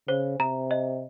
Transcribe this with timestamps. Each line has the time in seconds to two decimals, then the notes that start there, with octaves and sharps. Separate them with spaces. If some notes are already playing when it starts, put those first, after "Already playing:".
0.08 C#3 C5
0.39 C3 A#5
0.71 D#5